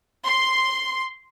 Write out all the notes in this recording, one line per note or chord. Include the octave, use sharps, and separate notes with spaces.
C6